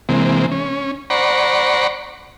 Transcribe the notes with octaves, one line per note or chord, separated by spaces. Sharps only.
C3 E3 G#3 A#3 C4
C#4
C5 D5 F#5 A#5 B5 C#6